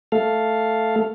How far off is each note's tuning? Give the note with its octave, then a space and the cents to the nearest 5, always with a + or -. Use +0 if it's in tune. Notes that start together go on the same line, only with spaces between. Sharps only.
A3 +0 A4 +0 F5 +0